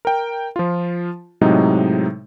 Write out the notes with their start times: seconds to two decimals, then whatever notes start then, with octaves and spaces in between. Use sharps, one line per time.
0.05 A#4 G5
0.56 F3 F4
1.41 A2 C3 F#3 G#3 D#4